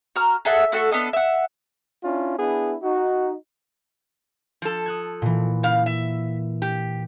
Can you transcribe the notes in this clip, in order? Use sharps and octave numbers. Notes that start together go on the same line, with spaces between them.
F#4 A#5 F6
G#4 A4 E5 F#5
A3 F#4 A4 C#6
B3 D4 A4 D#5
E5 F#5
C#4 D4 E4 F4
B3 D4 E4 G#4
D#4 F#4
F3 A4
D#6 F#6 G#6
A#2 E3
C#3 F5
E5
G4